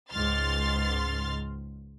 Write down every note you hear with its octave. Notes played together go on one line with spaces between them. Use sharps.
C#2 G#2 C6 F6 A6